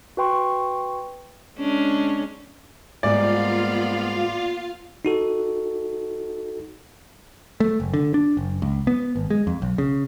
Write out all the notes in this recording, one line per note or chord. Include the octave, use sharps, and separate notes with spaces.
F#4 B4 G5 C6 C#6
G#3 C#4 D4
G#2 G3 A#3 B3 F4 D5 F5
D#4 F#4 A4
A3
F#1
D3
D4
F#1
C#2
B3
G#1
G#3
F2
B1
C#3